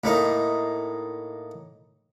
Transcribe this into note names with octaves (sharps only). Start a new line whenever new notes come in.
A2 A#3 D#4